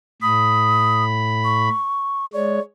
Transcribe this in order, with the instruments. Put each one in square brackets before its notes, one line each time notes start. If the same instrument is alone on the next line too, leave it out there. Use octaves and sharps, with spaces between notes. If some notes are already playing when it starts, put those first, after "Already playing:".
[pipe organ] A2 B5 [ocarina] D#6
[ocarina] C#6
[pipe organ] G#3 C#5 [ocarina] D5